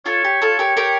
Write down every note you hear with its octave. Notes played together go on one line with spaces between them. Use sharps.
F4 A4 C#5
G4
F4 A4
G4 A#4
G4 A#4